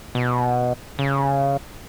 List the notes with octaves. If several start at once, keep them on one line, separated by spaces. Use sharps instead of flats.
B2
C#3